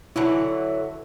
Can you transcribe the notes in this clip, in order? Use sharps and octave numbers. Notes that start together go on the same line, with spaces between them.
D3 E3 F#3 E4